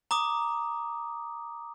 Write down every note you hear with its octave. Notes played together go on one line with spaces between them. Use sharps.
A#5 D6 D#6